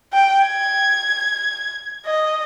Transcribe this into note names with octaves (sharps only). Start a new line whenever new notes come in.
G5
G#6
D#5